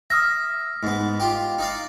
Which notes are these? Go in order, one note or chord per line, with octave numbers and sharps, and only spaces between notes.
E5 D#6 F6 A#6
G#2 B3
F4 G4
D#4 D5 F5